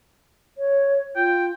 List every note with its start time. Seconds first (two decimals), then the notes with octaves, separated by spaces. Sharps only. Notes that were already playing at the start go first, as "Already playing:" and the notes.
0.58 C#5
1.16 F4 G5